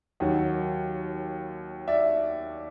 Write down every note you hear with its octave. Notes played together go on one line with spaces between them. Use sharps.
D#2 D#3 F#3
D5 E5